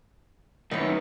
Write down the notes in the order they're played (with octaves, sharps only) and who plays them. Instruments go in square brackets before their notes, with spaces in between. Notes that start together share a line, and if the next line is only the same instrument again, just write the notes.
[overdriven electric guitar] F#2 D#3 [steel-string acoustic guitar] D#4 B4 C#5